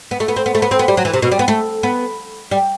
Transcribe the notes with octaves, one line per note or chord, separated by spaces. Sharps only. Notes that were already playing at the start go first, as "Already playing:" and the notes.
B3
A3
B3
C4
B3
A3
B3
C4
B3
G3
F#3
E3
C3
B2
G3
B3
A3
B3
G3